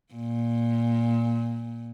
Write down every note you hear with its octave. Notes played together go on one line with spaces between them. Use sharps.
A#2